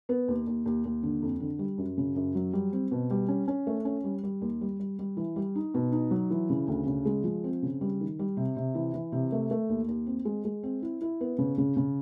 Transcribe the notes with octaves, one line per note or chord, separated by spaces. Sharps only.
B3
D#2
D#2
D#2
D#2
D3
F2
D3
G3
F#2
C#3
F#2
F#3
G3
C4
B2
G3
C#4
C#4
A3
C#4
G3
G3
D#2
G3
G3
G3
E3
G3
D#4
B2
D#4
F#3
E3
C#3
D2
C#3
G#3
F3
C4
C#3
G3
D#3
G3
C3
C3
E3
E3
C3
A3
A3
D#2
D#2
C4
G#3
G#3
C4
E4
E4
B3
C#3
C#3
C#3